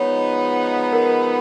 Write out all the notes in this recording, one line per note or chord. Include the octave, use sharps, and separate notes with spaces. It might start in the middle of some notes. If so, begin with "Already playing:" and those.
Already playing: F3 G#3 B3 D#4 C#5
A#4